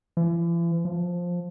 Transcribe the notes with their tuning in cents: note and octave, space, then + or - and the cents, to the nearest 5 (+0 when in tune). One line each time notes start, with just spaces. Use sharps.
E3 +45
F3 +10